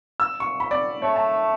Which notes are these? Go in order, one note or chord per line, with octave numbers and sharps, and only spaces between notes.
E6
C#6
B5
D5
A3 C#5
A5